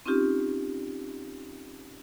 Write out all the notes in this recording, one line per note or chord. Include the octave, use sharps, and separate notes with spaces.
C4 C#4 D#4 F4 G4